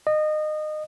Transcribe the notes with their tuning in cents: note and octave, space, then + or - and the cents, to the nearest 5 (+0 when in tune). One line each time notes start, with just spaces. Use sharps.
D#5 -25